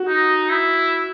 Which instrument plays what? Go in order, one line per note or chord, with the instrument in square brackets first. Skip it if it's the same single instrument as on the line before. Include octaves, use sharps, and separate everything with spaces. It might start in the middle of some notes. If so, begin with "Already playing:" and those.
Already playing: [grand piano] F#4
[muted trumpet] D#4
E4